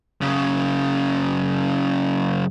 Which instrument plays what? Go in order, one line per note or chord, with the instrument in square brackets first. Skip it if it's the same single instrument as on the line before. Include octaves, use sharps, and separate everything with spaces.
[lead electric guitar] F#2 C#3